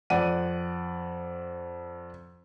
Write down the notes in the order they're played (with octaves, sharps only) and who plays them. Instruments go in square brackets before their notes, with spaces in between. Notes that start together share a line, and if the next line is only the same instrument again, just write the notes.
[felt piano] F2 D5 F#5 D#7